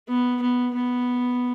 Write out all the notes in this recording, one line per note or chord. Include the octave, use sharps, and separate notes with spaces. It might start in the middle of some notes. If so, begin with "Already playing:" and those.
B3
B3
B3